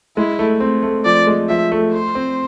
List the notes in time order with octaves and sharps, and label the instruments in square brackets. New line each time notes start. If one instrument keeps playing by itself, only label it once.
[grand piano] G#3 [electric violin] E4
[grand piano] A3
C4
A3
[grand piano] F3 [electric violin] D5
[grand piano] G#3
[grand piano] F3 [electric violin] E5
[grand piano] A3
[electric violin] C5
[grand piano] C4